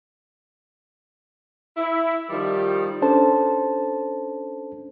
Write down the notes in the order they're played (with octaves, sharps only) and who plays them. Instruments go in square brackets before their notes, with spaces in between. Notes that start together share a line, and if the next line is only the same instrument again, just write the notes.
[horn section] E4
D#3 F3 G3
[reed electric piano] C#4 D4 A4 C5 A5